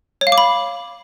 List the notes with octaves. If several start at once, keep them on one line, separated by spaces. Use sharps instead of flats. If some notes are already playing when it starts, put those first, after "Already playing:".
C#5
F5
D6
B5